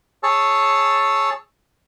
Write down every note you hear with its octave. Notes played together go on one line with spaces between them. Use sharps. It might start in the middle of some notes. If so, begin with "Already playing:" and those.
G#4 C#5 A5 E6